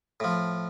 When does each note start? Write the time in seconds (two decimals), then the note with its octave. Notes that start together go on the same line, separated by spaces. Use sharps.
0.20 A2 F3